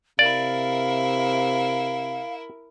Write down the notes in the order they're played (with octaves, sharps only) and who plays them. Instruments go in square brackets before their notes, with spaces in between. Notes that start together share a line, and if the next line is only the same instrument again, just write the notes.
[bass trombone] C3 [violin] E4 A#4 [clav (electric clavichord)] D5 [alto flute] F5